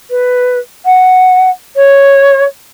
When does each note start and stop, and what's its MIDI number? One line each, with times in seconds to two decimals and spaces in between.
0.10 0.58 71
0.85 1.49 78
1.75 2.44 73